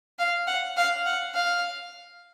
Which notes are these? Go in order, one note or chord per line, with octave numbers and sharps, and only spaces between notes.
F5
F#5
F5
F#5
F5